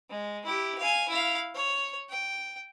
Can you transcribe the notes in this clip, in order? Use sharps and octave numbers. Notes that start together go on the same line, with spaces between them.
G#3
E4 G4
F5 G#5
E4 F5
C#5
G5